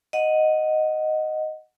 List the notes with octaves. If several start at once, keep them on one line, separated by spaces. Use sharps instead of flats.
D#5 F#5